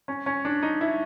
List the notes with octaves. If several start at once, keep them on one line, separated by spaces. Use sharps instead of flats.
C#4
C#4
D4
D#4
E4